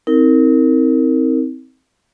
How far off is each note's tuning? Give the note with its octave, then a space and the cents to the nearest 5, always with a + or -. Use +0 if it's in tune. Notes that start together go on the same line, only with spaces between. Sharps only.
C4 +0 D#4 +45 A#4 -15